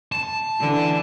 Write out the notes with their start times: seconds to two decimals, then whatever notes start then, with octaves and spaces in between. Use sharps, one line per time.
0.12 A5
0.60 D3 E3